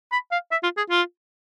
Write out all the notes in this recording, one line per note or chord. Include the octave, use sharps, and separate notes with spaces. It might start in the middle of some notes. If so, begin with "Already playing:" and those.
B5
F5
E5
F4
G#4
F4